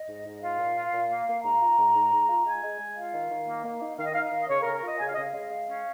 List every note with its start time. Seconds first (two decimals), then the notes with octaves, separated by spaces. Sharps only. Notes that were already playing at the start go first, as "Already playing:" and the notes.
Already playing: D#5
0.09 G#2
0.26 G#2
0.43 F4 F5
0.59 A#2
0.77 F4
0.94 A#2
1.10 A#3
1.27 A#3
1.45 G#2 A#5
1.62 F4
1.78 G#2
1.95 G#2
2.13 G#2
2.29 F4
2.46 G#3 G#5
2.63 G#3
2.80 G#3
2.97 F4 F5
3.14 D#3
3.31 D#3
3.48 A#3
3.65 A#3
3.82 D#4
3.99 D#3 F5
4.06 D#5
4.13 D#4 F5
4.24 F5
4.32 D#3
4.42 D#5
4.50 C#3 C#5
4.62 A#4
4.66 C#3
4.74 A#4
4.83 F4 D#5
5.00 C#3 G#5
5.07 F5
5.14 D#5
5.18 C#3 F5
5.34 G#3
5.51 G#3
5.68 C#4